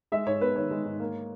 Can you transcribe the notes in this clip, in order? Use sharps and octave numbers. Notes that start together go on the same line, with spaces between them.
G#3 E5
G#2 C#5
B3 B4
D#3 C#5
G#3
G#2
A#3